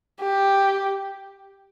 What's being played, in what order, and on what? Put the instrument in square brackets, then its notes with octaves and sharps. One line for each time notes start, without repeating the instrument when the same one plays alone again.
[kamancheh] G4